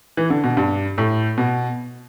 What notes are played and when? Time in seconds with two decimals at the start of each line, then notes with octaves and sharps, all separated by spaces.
0.17 E3
0.30 D3
0.44 B2
0.57 G2
0.98 A2
1.37 B2